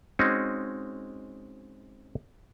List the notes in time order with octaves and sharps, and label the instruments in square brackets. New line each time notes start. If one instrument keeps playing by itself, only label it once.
[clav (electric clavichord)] G#3 C4 C#4 D#4 F#4